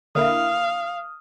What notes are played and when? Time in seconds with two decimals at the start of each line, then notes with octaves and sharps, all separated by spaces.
0.15 D3 A#3 E4 F5 D#6 F6